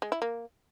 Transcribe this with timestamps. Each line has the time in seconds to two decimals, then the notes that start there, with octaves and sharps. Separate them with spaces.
0.02 G#3
0.12 E4
0.22 A#3